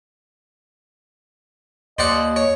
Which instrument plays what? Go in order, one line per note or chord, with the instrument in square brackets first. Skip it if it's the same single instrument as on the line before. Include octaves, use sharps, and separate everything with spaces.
[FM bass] D#2 [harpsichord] C5 D5 F#5 [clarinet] D#5
[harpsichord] C#5